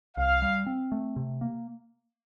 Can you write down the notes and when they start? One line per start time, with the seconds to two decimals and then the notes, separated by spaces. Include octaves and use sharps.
0.17 C2 F5
0.42 G3
0.66 C4
0.92 A3
1.16 C3
1.41 A#3